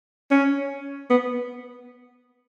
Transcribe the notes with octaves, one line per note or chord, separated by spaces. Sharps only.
C#4
B3